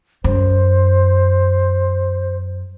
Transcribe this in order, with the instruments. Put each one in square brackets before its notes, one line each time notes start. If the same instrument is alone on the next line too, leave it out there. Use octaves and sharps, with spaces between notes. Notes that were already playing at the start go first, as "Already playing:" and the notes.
[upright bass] F#2 [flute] C5